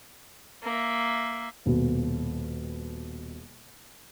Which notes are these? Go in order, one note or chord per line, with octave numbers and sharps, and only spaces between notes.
A#3 E5
D#1 B2